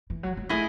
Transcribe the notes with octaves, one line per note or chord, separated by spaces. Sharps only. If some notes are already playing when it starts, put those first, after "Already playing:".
E3
F#3
G#3
A3 E4 G#4 D#5